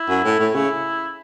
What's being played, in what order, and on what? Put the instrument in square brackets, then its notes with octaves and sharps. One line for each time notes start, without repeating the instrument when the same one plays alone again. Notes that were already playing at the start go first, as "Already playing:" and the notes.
Already playing: [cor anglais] E4
[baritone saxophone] F#2
A2
A2
[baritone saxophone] C#3 [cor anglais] E4